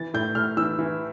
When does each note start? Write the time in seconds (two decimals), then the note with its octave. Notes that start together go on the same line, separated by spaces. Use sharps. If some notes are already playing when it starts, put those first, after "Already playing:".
Already playing: E3 A6
0.14 A2 G6
0.35 A2 F6
0.57 E3 E6
0.79 E3